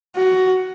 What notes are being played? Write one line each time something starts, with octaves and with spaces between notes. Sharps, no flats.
F#4